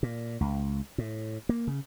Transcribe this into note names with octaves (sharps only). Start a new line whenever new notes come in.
A#2
C#2
A2
A#3
C#3